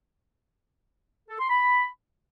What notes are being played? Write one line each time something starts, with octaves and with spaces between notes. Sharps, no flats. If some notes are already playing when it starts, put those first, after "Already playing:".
A4
C6
B5